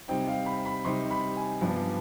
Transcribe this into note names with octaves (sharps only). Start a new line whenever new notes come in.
C3 G3 C4 D#4 G5
F5
B5
B5
C3 G3 C4 D#4 C6
B5
G#5
G2 F3 B3 D4